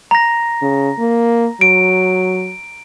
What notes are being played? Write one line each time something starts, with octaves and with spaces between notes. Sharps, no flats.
A#5 A#6
C#3
A#3
F#3 D7